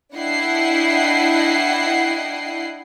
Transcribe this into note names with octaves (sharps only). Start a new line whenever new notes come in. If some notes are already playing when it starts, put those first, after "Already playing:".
D4 E4 D#5 F#5 G5 C7